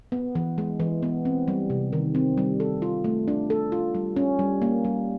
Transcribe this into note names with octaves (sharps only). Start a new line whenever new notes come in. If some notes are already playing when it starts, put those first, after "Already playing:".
B3
E3
G#3
E3
B3
C4
G3
C3
D#3
C4
G3
A4
F4
A3
D4
A4
F4
G3
C#4
G3
A#3
G3